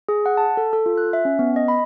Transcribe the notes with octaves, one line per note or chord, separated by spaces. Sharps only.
G#4
F#5
A5
A4
A4
F4
F#6
E5
C#4
B3
D#5
B5